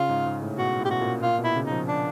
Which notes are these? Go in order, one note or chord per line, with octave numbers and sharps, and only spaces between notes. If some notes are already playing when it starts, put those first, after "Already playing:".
Already playing: C#3 F4
G#2
G#2
A2
B2 F#4
A2
G4
B2 F#4
A#2
A#2 F4
B2
E4
C#3
D#4
F3
D4